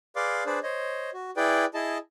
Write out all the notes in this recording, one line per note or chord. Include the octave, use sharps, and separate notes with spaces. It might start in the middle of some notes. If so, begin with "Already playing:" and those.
G#4 B4 D5 F5 C6 D6
D4 G#4 B4 C5 D5
C5 C#5 D#5
F#4
E4 G#4 B4 D5 G5
E4 G#4 D#5 A5